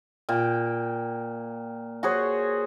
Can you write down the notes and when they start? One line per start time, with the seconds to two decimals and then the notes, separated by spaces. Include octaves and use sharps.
0.29 A#2 G5
2.03 F#4 G#4 C5 C#5